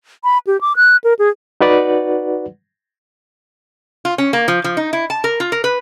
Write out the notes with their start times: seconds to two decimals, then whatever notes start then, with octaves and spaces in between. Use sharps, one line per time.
0.24 B5
0.47 G4
0.61 D6
0.76 F#6
1.04 A#4
1.19 G#4
1.61 D#4 F#4 B4 D5 F#5
4.05 F4
4.18 C#4
4.33 A#3
4.48 F3
4.64 F3
4.77 D#4
4.93 E4
5.10 A5
5.24 A#4
5.40 F4
5.52 A#4
5.64 B4